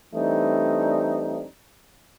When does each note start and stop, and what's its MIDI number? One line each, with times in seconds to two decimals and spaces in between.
0.14 1.44 52
0.14 1.44 55
0.14 1.44 57
0.14 1.44 60
0.14 1.44 62
0.14 1.44 63